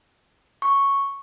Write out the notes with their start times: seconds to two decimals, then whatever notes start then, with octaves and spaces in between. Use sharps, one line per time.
0.62 C#6